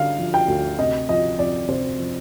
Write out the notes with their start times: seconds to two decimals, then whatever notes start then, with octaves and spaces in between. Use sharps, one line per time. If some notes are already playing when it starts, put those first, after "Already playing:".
Already playing: D3 F5
0.19 F3
0.34 G5
0.48 D2
0.78 C3 D#5
1.09 F3 D#5
1.38 F2 D5
1.68 C3 C5
1.99 F3